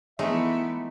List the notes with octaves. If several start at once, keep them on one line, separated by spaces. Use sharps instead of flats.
E3 G#3 A3 B3 D#4 E5